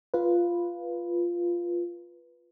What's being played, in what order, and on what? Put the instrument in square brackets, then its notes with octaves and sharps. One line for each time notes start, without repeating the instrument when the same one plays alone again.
[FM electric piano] F4 B4